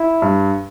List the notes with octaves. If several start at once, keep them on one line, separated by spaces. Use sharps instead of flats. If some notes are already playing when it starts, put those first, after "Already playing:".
Already playing: E4
G2